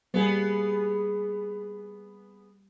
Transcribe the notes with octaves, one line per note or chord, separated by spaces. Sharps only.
G3 A#3 B3 G#4